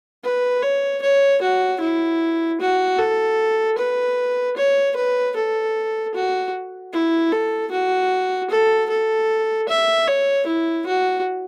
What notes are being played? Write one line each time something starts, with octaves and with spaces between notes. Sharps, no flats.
B4
C#5
C#5
F#4
E4
F#4
A4
B4
C#5
B4
A4
F#4
E4
A4
F#4
A4
A4
E5
C#5
E4
F#4